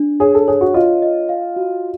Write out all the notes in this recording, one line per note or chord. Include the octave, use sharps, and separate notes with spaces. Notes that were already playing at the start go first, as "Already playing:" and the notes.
Already playing: D4
G#4 C#5
A4
G#4 C#5
F#4
F4 D#5
D#5
F5
F#4